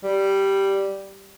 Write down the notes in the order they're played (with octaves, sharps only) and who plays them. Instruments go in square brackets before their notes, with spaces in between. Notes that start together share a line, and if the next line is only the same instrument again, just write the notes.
[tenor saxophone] G3